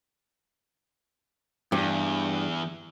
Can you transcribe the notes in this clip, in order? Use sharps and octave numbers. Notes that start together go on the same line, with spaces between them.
E2 G2